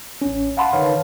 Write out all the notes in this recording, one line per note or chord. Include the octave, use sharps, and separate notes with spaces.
A1 C#4
F5 F#5 A5 B5 C6
D3 D#3 B4 C#5 F5 A5